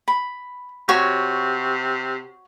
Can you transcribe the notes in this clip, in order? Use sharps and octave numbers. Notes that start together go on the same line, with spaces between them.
B5
C3 F#4 C#5